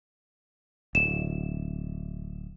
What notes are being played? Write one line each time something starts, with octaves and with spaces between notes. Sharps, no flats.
D1 E7